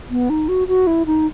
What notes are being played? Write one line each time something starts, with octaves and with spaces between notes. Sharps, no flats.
B3
D#4
F#4
F#4
E4
D#4